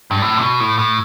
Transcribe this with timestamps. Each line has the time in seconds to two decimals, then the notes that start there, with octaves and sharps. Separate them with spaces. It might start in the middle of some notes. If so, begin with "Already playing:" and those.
0.11 G2
0.22 A2
0.38 C3
0.41 B2
0.60 A2
0.79 A2